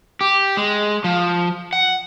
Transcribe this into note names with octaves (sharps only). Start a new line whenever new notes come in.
G4
G#3
F3
F#5